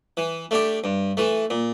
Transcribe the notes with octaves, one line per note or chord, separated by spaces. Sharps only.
E3
A3 D4 G4
G2
E3 A3
A#2